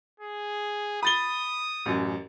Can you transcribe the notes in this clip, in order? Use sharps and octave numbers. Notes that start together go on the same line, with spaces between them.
G#4
B5 D#6 A6 G7
A1 F#2